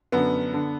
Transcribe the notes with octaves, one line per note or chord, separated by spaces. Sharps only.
F#2 D3 B3
D3